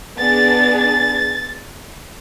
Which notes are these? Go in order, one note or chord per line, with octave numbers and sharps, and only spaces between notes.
B3 D4 G#4 A6
A6